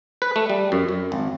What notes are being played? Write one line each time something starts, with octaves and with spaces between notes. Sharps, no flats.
B4
A3
G3
F#2
F#2
G#1